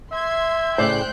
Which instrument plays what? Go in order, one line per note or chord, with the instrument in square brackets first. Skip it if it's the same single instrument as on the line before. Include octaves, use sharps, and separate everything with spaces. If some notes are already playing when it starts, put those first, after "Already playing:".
[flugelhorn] E5 [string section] C6 G#6
[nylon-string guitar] A2 C#3 D5 [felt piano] C5 [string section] G5 F#6 G6